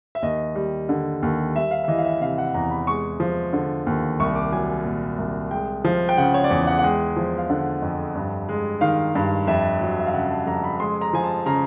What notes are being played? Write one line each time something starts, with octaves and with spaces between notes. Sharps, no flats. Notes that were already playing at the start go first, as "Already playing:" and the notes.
E5
D#2 D#5
G3
D3
D#2
G3 E5
F5
E5
E3 D#5
F5
E5
C3 F5
F#5
E2 A#5
B5
G#3 C#6
F3
D3
D#2
C2 C#6
D6
F#3 G#5
G#5
A#2
C2
G#3 G5
F3
G5
C#3 F#5
C#5
D5
E2 C#5
F#5
F#5
G#3 G5
F3
F5
D3 F#5
F2
G2
G#3
D#3 F5
G2
F2 E5
F#3
E5
F5
C#3 F#5
A5
F2 A#5
B5
G#3 C6
A#5
F3 G#5
A5
C#3 A#5